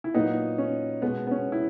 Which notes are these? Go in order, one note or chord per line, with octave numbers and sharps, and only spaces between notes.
E4
A#2 F#3 A#3 B3 D#4
C#4
B2 G#3 B3
B3
C#4
E4